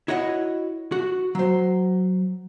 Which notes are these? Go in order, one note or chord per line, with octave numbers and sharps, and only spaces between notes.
E4 F#4 C#5 D#5 F#5
F#4
F#3 C5